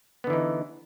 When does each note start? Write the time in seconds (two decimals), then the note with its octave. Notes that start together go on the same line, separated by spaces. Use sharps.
0.24 B3
0.27 D3
0.30 E3
0.33 D#4